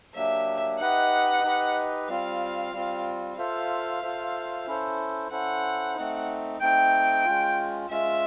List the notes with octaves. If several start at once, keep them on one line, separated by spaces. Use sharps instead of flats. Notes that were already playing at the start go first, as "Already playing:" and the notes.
F#3 A#3 D4 G4 E5
D#4 G4 B4 D#5 F#5
D#4 G4 B4 D#5
G3 C4 F4 F5
G3 C4 F4
F4 A4 C5 E5 F5
F4 A4 C5 E5
C#4 E4 A4 C5
C#4 E4 A4 C5 F#5
A3 C4 D#4
A3 C4 D#4 G5
G#3 C#4 F4
G#3 C#4 F4 E5